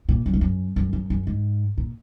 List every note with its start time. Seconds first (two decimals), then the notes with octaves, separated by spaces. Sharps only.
0.09 A#2
0.26 F#2
0.34 G#2
0.41 F#2
0.76 F#2
0.93 F#2
1.10 F#2
1.27 G#2
1.78 A#2